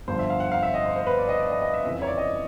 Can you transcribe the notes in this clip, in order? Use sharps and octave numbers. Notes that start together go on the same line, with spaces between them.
G1 G2 D3 F3 C5
E5
F5
F#5
F5
E5
D#5
C5
C5
B4
D5
D#5
D5
D#5
D#5
E5
F2 C#3 E3 E5
E5
C#5
D5
D#5